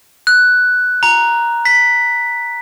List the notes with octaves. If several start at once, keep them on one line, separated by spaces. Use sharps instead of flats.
F#6
A#5
B6